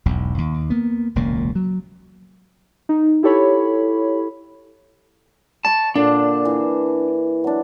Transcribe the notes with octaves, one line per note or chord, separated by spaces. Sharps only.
E1 B1 E2
D#2
A#3 B3
E1 C#2 A#2 A#3
F#3
D#4
E4 G4 A4 C#5 B5
A5 B5 C#6 D6
A#2 D3 D4
E3
F#3 D4